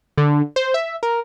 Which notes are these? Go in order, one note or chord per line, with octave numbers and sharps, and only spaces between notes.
D3
C5
E5
A#4